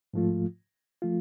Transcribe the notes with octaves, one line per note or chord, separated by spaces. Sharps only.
G#2 F3 A3 F4
F3 A3 F4